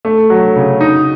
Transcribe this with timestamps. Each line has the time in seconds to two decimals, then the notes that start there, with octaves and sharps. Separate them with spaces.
0.05 A3
0.30 F#3
0.56 C#3
0.81 D#4